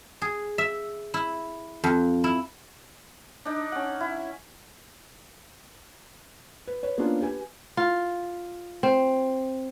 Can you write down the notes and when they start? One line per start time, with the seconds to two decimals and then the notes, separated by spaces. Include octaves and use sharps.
0.22 G#4
0.58 E5
1.14 E4
1.84 F2
2.24 E4
3.45 D4 D#4
3.72 C#4 F#5
4.00 E4
6.68 B4
6.83 B4 C#5
6.98 A#3 B3 C#4 D4 F4
7.21 G4 B4 G#5
7.77 F4
8.83 C4